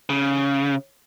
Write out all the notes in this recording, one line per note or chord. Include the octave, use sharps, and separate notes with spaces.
C#3